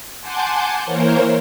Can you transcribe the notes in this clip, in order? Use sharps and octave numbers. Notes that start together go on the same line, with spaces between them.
F#5 G#5 A5 C6 D6 G6
E3 A#3 A#4 C5 C#5